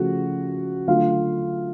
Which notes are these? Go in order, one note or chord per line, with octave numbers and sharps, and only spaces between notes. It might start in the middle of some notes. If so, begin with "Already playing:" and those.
Already playing: C#3 F3 A3 F#4
D3 F#3 A3 F4 F5